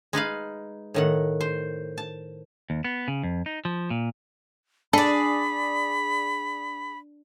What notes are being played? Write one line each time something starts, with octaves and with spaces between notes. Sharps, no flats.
G#3 D#4 B4 F5
A2 D#3 F#5
C5
A5
D#2
B3
C#3
F2
D#4
F3
A#2
D4 G#4 A4 D5 B5